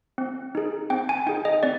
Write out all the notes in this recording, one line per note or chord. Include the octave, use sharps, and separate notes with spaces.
C4
D#4 G#4
C4 G5
G#5
D#4 G#4 G5
D#5
C4 D5